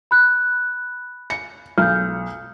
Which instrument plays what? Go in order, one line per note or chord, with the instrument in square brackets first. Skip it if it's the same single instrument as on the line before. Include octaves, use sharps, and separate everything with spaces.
[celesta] B5 F#6
[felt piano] C#7
[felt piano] B1 [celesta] F6 G6